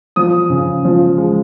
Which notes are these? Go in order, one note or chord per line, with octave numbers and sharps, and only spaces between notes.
F3 D#6
C#3
F3
G#3